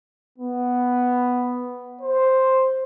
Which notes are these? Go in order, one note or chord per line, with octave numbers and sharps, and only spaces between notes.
B3
C5